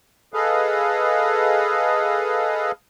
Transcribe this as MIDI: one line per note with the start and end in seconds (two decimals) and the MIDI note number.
0.34 2.72 68
0.34 2.72 69
0.34 2.72 71
0.34 2.72 75
0.34 2.72 77